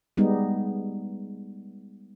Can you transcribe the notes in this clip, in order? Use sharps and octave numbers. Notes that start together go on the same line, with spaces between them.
G3 G#3 B3 D#4